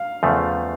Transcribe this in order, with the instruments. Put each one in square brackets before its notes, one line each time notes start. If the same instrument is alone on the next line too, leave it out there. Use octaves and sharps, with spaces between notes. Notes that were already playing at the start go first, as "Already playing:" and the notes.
Already playing: [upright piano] F5
[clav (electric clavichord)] E2 C#3 F3 A3